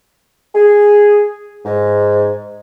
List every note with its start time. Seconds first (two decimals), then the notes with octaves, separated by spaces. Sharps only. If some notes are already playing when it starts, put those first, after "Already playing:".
0.55 G#4
1.66 G#2